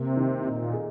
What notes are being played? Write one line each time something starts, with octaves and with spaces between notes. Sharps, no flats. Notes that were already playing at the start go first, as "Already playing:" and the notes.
Already playing: C3 A#3
D#3
A#2 D#4
G#4